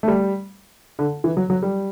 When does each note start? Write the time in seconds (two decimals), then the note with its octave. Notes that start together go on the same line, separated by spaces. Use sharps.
0.03 A3
0.08 G3
0.99 D3
1.24 E3
1.37 F#3
1.50 F#3
1.62 G3